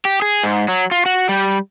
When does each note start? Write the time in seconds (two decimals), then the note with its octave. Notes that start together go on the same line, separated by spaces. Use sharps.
0.05 G4
0.22 G#4
0.44 G#2
0.68 F#3
0.91 F4
1.06 F#4
1.29 G3